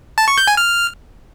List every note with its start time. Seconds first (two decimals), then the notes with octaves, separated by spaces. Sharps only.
0.18 A5
0.28 C#6
0.38 G6
0.47 G#5
0.57 F6